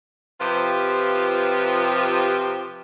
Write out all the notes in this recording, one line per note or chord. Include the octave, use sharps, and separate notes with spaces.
C3 F3 F4 G4 B4